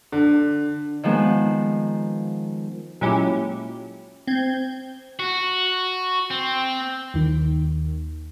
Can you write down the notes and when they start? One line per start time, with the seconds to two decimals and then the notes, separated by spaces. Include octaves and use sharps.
0.12 D3
1.03 D#3 F3 G#3 B3
3.01 A#2 F#3 G#3 C#4 E4 G4
4.27 C4 G6 G#6
5.19 F#4
6.31 C4
7.14 D#2 D#3